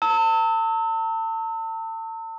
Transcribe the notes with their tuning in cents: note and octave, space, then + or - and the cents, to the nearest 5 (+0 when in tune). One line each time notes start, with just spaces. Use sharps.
A5 +40 E6 -30